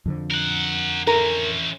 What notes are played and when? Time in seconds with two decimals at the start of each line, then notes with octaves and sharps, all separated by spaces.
0.06 F2 D3 F3
0.31 A#4 F#5
1.07 E3 C#4 A#4